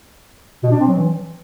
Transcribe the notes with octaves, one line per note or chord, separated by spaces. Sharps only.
B2
D4
C4
F#3
E3